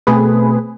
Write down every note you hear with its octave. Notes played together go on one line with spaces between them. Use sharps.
B2 A3 C4 G#4 B4